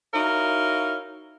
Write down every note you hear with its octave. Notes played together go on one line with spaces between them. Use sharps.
D#4 E4 F#4 A#4 C#5 F5